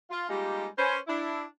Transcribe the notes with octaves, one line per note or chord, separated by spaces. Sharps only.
F4
G3 G#3 A#3 D#4 F4 G4
C#4 B4 C5
D4 E4